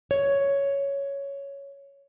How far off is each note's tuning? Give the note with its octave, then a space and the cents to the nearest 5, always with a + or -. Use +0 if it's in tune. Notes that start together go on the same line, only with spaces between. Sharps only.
C#5 +5